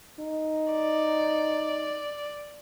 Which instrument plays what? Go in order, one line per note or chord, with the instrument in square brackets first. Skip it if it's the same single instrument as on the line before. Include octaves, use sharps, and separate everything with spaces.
[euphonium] D#4
[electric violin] D5